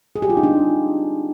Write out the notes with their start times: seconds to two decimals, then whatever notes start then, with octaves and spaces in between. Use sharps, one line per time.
0.16 G#4
0.22 G4
0.30 F4
0.37 D#4
0.43 C4 D4